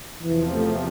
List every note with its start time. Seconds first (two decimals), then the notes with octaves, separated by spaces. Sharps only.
0.23 E2 C3 E3 F3
0.53 A3